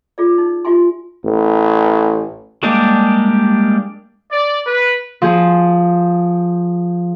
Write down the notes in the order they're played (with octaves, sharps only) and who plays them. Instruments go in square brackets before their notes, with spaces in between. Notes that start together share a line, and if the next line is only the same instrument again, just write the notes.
[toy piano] F4 G#4 D5
D#4
F4 G4 E5 G#5 C6
[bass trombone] A1
[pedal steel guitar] G3 G#3 A#3 D4 G4
[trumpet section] D5
B4
[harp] F3 G#4